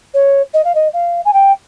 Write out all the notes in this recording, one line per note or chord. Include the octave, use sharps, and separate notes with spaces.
C#5
D#5
F5
D#5
F5
G#5
G5